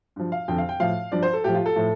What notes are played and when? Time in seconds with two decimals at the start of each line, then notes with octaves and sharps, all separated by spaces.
0.16 G2 F3
0.32 F5
0.48 F2 D3 F3 G5
0.58 F5
0.69 G5
0.80 A2 F3 F5
1.12 G2 F3 D5
1.23 C5
1.33 A4
1.44 A2 F3 G4
1.55 F4
1.66 A4
1.76 A2 F3